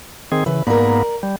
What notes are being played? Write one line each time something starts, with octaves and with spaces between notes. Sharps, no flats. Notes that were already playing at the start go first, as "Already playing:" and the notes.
D#3 C4 G#4
C#3 E3 B4
G#2 A#3 B3 A#4 D5
G3